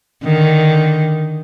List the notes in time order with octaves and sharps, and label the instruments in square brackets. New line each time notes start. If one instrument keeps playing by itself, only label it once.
[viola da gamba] D3 D#3